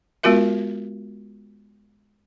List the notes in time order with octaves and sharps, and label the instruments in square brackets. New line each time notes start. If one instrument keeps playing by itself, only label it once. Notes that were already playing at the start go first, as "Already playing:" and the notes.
[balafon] G#3 B3 F4 F#4 A#4 E5